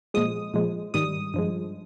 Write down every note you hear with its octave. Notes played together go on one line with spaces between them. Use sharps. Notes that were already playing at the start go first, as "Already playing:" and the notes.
A#2 F3 G#3 D#6
A#2 F3 G#3
G#2 D#3 G3 D#6
G2 F3 G#3